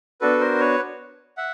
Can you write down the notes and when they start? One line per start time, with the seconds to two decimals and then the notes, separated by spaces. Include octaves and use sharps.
0.21 B3 D4 F#4 A4 B4
0.40 A#4 C5
0.60 B4 C#5
1.37 E5 F#5